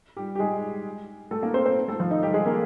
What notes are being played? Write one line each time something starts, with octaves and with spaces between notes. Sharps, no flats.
G3 G4
G4
G#3 G#4
A3 A4
A#3 A#4
C4 C5
C4 C5
A3 A4
F3 F4
D#3 D#4
G3 G4
G#3 G#4
A#3 A#4